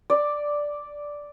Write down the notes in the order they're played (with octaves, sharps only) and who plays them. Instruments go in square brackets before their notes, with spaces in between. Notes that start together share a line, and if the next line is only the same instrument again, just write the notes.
[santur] D5